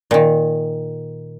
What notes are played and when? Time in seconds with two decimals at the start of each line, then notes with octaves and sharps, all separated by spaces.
0.11 A#2 D#3